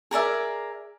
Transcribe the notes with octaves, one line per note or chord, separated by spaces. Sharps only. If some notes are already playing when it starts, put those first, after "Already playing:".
G#4 A#4 D5 E5